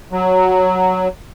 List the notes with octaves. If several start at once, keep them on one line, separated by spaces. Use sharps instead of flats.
F#3